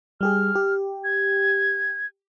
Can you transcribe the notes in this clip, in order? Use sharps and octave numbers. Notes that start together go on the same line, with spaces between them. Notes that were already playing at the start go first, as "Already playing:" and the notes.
G3 G4 G#4 F6
G4
G#6